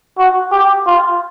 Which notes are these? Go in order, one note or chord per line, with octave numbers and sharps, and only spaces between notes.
F#4
G4
F4